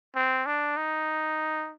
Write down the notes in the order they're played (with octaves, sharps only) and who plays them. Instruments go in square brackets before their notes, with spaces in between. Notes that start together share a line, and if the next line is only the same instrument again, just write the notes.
[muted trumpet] C4
D4
D#4